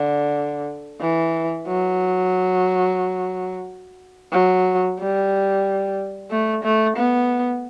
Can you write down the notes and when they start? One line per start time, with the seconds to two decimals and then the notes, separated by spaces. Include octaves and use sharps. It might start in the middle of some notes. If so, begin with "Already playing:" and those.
Already playing: D3
1.01 E3
1.68 F#3
4.32 F#3
4.99 G3
6.30 A3
6.64 A3
6.96 B3